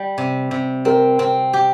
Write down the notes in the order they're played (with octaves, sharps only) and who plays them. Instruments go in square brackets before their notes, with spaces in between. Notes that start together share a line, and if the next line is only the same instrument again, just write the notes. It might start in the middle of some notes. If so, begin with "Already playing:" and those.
Already playing: [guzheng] G3
C3
C3
[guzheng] C4 [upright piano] A#4
[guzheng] C4
G4